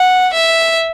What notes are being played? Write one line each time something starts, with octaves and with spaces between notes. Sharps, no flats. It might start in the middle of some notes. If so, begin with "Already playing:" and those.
Already playing: F#5
E5